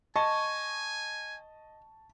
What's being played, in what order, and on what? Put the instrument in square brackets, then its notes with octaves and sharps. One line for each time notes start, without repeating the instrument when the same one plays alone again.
[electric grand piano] D#5 [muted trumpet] G#5 [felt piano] A5 [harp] C#6